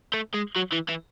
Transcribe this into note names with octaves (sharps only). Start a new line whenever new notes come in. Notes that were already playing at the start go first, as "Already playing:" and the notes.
A3
G#3
F#3
E3
E3